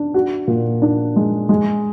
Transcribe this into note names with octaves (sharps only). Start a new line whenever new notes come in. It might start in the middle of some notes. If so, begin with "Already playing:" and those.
Already playing: D4
F#4
A#2
D4
G#3
G#3